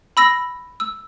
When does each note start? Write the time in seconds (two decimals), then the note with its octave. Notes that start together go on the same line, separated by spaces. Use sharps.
0.17 B5 E6 A#6
0.80 E6